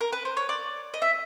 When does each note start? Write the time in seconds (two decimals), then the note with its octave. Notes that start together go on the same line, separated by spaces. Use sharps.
0.01 A#4
0.12 B4
0.25 C5
0.37 C#5
0.49 D5
0.94 D#5
1.02 E5